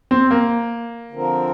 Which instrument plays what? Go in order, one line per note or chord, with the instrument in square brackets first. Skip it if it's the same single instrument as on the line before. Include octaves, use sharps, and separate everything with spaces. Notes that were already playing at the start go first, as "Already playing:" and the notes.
[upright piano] C4
A#3
[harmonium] D3 F3 C4 A#4